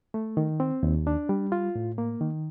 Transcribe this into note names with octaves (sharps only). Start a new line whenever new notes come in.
A3
D#3
C4
D#2
D4
G3
F4
A2
A#3
D#3